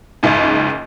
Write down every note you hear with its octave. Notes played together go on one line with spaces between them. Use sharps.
F#1 C#2 G#2